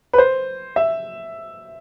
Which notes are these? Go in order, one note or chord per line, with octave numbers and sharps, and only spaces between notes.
B4
C5
E5